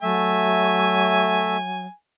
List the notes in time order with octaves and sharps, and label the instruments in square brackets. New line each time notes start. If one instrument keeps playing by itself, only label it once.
[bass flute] F#3 [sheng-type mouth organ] A3 E5 [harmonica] G#5